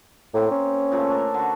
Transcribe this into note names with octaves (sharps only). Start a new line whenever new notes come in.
A2 A#3 C4
C#4
A#2 C#3 A3
D4 A4 A#4
D3 F#4